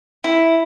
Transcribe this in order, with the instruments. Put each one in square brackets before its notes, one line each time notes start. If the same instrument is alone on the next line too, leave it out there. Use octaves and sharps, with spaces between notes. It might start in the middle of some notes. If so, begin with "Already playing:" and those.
[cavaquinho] E4